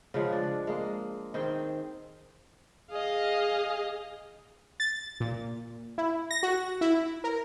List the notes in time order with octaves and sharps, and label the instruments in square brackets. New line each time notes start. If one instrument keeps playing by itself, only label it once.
[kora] C#3 F3 G#3 F#5
D4 D5
G#3 A#3
D#3 C4 G#4 G5
[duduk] G#4 [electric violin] D#5 F5
[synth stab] A6
A#2
E4
A#6
F#4
E4
A#4